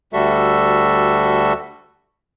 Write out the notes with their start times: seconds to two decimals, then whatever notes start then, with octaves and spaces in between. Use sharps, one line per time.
0.13 D2 G3 F#4 A4 E5